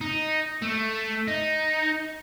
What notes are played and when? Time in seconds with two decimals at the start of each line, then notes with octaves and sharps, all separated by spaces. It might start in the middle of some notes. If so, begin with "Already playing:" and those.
0.01 D#4
0.62 A3
1.27 D#4